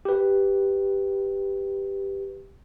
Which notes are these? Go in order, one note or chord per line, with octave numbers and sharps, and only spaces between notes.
G4 B4